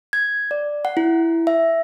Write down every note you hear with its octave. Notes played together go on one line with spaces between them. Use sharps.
G#6
D5
F#5
E4
E5